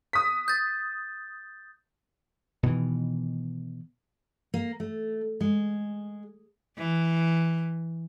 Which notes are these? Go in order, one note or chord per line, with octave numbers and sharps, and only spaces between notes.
D#6 B6
G6 A6
B2 D#3 E3
A#3
A3
G#3
E3